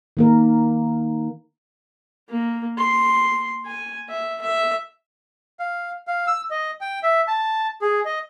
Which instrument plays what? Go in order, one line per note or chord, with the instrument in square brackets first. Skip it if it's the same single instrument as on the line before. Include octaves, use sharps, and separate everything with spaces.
[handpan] D#3 A#3 A#4
[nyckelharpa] A#3
C6
G#5
E5
E5
[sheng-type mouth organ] F5
F5
E6
D#5
G5
E5
A5
G#4
D#5